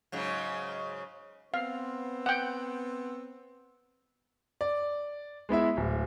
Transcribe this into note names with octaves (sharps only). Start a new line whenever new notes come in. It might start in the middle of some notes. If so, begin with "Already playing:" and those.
G#2 C#3 F#3
B3 C4 F5
F#5 G5
D5
G#3 B3 E4 E5
D1